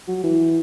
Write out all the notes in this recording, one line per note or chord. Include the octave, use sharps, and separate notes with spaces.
F#3
E3